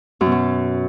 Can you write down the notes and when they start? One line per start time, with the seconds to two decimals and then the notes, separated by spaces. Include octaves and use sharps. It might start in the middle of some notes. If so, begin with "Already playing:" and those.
0.21 F#2
0.26 B2
0.32 F#3